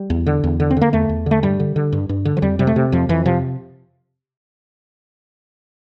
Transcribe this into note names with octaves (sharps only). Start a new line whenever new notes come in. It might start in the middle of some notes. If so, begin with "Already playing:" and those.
Already playing: G3
E2
D3
E2
D3
C4
D3 A#3
E2 A3
E2
D3 A3
G2 G3
D3
D3
G2
G2
D3
F3
F2 G3
C3 G3
A3
C3
F2 F3
F2 E3
C3 F3